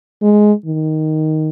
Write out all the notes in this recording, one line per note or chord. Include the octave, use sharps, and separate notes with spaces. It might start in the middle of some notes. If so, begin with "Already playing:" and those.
G#3
D#3